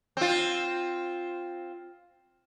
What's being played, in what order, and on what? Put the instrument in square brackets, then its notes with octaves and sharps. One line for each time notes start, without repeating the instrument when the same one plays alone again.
[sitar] C4 F4